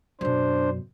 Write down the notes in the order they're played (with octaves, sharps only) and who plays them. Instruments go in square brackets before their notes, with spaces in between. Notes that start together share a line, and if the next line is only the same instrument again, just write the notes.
[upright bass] F#2 B2 [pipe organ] D4 C5